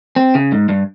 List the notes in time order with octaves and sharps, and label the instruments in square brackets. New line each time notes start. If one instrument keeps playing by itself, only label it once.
[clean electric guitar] C4
C#3
G#2
G2